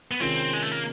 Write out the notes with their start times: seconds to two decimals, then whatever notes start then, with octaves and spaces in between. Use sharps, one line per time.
0.11 B3
0.20 C3 D#3 G#3 C4 C#4 F4
0.53 G#3
0.62 A3
0.71 A#3